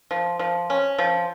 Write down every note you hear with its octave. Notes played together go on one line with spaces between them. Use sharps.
F3
F3
C#4
F3